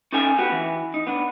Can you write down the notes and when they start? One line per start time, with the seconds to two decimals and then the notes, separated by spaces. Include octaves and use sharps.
0.12 C#4 D#4 A4 G#5
0.38 B3 F#4 G4
0.52 E3
0.94 D#4
1.07 B3 D4